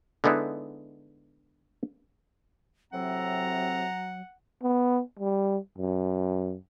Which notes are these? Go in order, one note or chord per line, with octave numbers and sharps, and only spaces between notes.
D3 G#3 B3 D#4 E4
A2 C3 F#3 C4 F#5 A#5
B3
G3
F#2